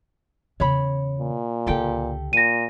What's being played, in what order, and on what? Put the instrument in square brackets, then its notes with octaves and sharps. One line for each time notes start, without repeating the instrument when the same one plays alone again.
[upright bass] E2 C#3 [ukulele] C#5 B5
[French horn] A#2
[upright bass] C#2 D3 [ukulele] G4 A4 G5
[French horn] A#2 [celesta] A#6 D#7